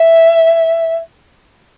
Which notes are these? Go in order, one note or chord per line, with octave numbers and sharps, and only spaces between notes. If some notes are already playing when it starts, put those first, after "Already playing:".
Already playing: E5